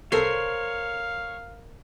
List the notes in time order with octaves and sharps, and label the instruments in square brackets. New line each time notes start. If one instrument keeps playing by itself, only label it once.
[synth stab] C2 A4 C7 [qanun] A#4 C5 [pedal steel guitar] C#5 [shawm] F5